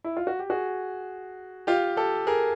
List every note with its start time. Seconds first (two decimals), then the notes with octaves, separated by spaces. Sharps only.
0.04 E4
0.17 F4
0.27 F#4
0.39 G4
0.50 F#4 G#4
1.67 F4 G4
1.97 G4 A4
2.27 G#4 A#4